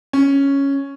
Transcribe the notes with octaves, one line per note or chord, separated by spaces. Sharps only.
C#4